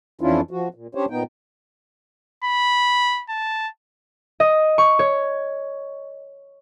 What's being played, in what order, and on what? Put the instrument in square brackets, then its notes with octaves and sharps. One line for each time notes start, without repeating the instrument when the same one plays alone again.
[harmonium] F2 E3 C#4 D4 E4 F4
F3 F#4
A#2
C#4 D4 G4 C5 C#5
A#2 B3 D#4 G5
[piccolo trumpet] B5
A5
[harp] D#5
C#6
C#5